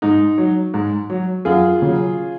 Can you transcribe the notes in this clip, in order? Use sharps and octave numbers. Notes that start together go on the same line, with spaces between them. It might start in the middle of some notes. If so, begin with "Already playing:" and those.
G#2 D#4
F#3
G#2
F#3
F#2 F4 G#4
C#3 F#3